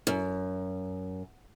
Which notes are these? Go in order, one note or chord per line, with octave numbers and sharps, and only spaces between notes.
F#2